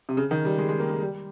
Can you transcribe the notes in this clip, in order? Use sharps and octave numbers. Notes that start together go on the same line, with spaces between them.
C3
C#3
D#3
G3
G#3
G#3
A#3
G#3
G3